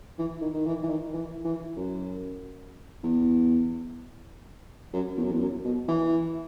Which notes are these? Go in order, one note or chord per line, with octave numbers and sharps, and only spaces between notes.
E3
D#3
D#3
E3
E3
D#3
E3
E3
F#2
E2
F#2
E2
F#2
E2
F#2
B2
E3